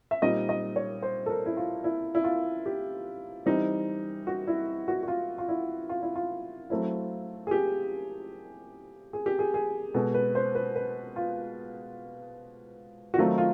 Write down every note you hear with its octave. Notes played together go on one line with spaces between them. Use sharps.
E5
A#2 G3 C4 D#4 D#5
D#5
C#5
C5
A4
A#4
E4
F4
E4
E4
F4
G4
E3 G3 C4 D#4
F#4
E4
F#4
F#4
F4
F4
E4
F4
E4
F4
F#3 A3 C4 E4
G#4
G4
G#4
G4
G#4
G#4
B2 G#3 B3 A4
B4
C5
B4
B4
F4
F#4
D#3 F#3 A3 C4 D#4 F4
F4